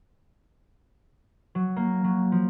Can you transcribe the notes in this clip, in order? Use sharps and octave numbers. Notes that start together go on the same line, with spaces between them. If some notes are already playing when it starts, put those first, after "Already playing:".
F#3
A#3
F#3
F3